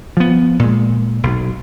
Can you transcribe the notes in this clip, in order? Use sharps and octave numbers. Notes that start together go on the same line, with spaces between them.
F3 B3
A#2 G#3
B1